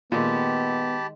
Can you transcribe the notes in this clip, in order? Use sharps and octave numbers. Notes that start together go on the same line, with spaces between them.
A#2 D#3 G#3 B3 G4 A5 B5